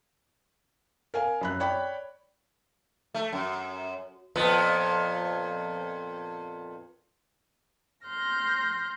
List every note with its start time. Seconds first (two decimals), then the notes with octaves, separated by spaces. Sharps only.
1.14 A#4 F5 G#5
1.41 F#2 B5 F#6
1.60 C#5 D5 G5 B5
3.14 A3
3.32 F#2
4.36 F2 A#2 B3
8.06 C6 F6 G6 A#6